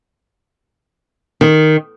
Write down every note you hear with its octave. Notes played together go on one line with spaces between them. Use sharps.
D#3